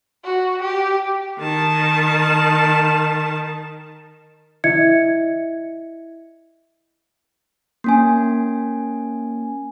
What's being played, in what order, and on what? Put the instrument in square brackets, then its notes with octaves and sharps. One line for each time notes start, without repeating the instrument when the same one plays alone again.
[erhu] F#4
G4
[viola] D#3 A5
[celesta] E4 D#5 E5 G#6 C#7
[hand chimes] A#3 C#4 G#5